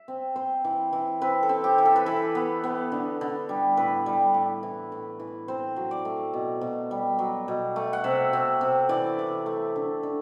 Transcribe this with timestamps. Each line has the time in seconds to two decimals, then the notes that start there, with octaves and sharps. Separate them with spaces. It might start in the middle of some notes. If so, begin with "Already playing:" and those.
Already playing: E5
0.08 C4
0.36 C4 C5
0.65 E3
0.93 E3
1.21 C4 B4
1.43 A4
1.49 C4
1.64 G4
1.78 E3
1.85 A4
1.96 B4
2.06 E3 A4
2.35 B3
2.64 B3
2.92 D3
3.21 D3
3.49 G3
3.77 A2 B4
4.06 G3
4.34 A2
4.63 E3
4.92 A2
5.20 E3
5.48 C4 C5
5.76 F#3
5.91 D5
6.05 A3
6.33 B2
6.61 B2
6.91 G3
7.19 F#3
7.48 B2
7.76 A3
7.93 F#5
8.04 C3 E5
8.33 C3
8.61 C3
8.89 E3 D5
9.19 E3
9.46 A3
9.76 D3
10.03 D3